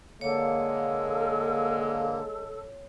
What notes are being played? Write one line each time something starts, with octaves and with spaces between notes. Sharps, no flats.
D3 G#3 A#3 A4 C#5